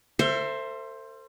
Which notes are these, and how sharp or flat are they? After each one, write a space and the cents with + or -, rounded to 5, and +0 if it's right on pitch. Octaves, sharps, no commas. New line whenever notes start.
A4 +45 C5 +10 E5 +15